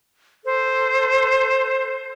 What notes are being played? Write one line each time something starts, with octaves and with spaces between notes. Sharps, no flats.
A4 C5